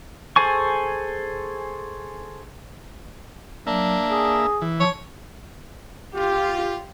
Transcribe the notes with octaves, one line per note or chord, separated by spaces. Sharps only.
G#4 A4 C5 G#5 C#6
F#3 A#3 D4 E5
G#4
E3
F3 C#5
F4 G4